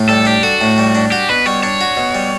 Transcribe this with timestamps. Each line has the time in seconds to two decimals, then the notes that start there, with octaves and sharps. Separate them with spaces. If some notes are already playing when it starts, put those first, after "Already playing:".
Already playing: A2
0.09 G3 A4
0.25 D4 G4
0.43 F#4 A4
0.61 A2
0.78 G3
0.95 D4
1.11 F#4 G4
1.29 B2 B4
1.46 G3 C#5
1.63 D4 C#5
1.81 F#4
1.97 B2
2.15 G3